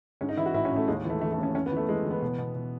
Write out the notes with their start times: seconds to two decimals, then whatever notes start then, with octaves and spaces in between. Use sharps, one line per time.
0.21 G#2 C#4
0.29 D#4
0.37 E3 E4
0.46 F#4
0.54 A1 E4
0.65 C#4
0.71 A1
0.76 A3
0.88 D#2 G#3
1.05 E3
1.10 A3
1.21 E3 A3
1.32 A3
1.38 D#2 C#4
1.55 F#2 C#4
1.66 B3
1.71 E3
1.76 A3
1.88 E3 G#3
2.05 E3
2.11 B3
2.22 B2
2.38 B2
2.55 B2